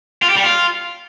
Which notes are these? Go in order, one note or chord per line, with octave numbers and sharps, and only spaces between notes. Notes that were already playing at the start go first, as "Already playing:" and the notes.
F4
G4
G3
F4